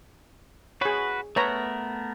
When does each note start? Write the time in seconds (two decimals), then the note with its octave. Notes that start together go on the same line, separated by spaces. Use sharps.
0.81 F#4 G#4 B4 C#5
1.36 A3 B3 A#4 B4 C#5 A#5